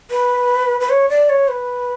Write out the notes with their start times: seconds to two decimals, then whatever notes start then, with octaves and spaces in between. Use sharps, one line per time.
0.11 B4
0.80 B4
0.90 C#5
1.09 D5
1.29 C#5
1.48 B4